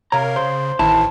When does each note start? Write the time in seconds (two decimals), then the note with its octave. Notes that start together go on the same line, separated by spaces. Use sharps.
0.12 C3 A#4 C#5 F5 A#5
0.36 C#3 C5 C6
0.79 A1 D#3 E3 E4 A5